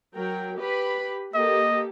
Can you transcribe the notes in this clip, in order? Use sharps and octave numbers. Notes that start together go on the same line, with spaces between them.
F#3 A#4 G5
G4 B4 B5
A#3 G4 A4 D#5